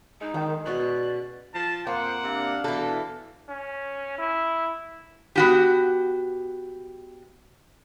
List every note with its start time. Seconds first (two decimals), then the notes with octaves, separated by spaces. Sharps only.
0.21 G#3 D#4
0.34 D#3 G5 A5
0.66 B2 C#4 D5 C#6 F#6
1.55 F3 A5
1.87 F2 A#3 C5 F#5
2.24 C3 D4 F5
2.64 B2 E3 A4
3.49 C#4
4.18 E4
5.36 B3 F#4 G4